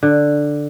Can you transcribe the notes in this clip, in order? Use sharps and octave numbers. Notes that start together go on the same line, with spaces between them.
D3